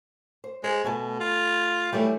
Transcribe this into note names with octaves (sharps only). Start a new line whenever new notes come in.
C5
G#3 C5
B2 A3 G#5 A5
F4
E3 F#3 G3 A3